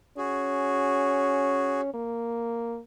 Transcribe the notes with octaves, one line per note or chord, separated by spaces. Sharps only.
C#4 F#4 G#4
A#3